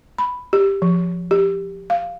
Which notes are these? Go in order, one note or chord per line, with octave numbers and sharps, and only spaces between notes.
B5
G4
F3
G4
F5